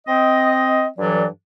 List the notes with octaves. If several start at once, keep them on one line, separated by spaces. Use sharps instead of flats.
C4 D#5
G2 E3 F#3 A4 D5